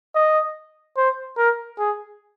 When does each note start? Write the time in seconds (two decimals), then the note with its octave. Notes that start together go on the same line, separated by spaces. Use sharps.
0.15 D#5
0.97 C5
1.37 A#4
1.78 G#4